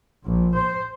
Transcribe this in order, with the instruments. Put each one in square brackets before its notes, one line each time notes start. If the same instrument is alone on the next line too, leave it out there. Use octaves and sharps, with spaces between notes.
[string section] A#1
C5